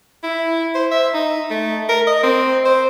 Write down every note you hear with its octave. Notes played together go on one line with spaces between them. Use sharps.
E4
C5
E5
D#4
A3
A#4
D#5
C4
C5